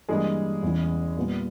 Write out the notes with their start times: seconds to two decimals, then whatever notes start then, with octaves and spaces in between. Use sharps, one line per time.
0.09 G2 E3 G3 G#3 A#3 G#4
0.63 E2 C#3 E3
1.17 A#2 G3 B3